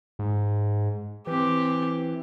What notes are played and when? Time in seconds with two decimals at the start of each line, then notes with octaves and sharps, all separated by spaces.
0.19 G#2
1.27 E3 C4 G4